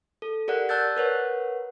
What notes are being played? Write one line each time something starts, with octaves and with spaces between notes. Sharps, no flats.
A4
G4 A#4 D5 F#5 F#6
D5 A5 E6 F#6 G6 A6
A#4 B4 C#5 F#5